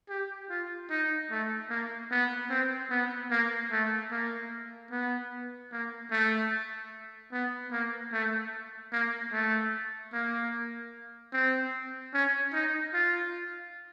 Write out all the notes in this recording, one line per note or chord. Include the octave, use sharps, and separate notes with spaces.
G4
F4
D#4
A3
A#3
B3
C4
B3
A#3
A3
A#3
B3
A#3
A3
B3
A#3
A3
A#3
A3
A#3
C4
C#4
D#4
F4